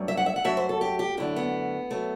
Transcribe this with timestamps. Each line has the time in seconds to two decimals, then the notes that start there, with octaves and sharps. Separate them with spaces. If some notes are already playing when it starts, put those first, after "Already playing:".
Already playing: G2 F#3 A3
0.08 E5
0.17 F#5
0.26 E5
0.36 F#5
0.44 F#2 F#3 A3 E5
0.57 C5
0.69 A4
0.81 G4
0.99 G4
1.17 F#2 D3 A3 E4
1.36 B3
1.91 F#3 A3